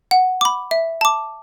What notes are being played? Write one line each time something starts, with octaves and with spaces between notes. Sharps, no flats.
F#5
B5 D6
E5
A5 D6